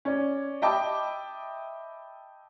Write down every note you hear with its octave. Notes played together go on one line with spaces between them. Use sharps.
C#4 D5
D#5 E5 G5 A5 B5 D6